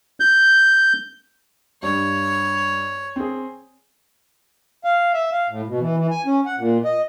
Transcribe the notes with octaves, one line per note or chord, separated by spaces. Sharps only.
G6
G2 C#5
C4 G#4
F5
E5
F5
A2
B2
E3
E3
G#5
C#4
F#5
A#2
D#5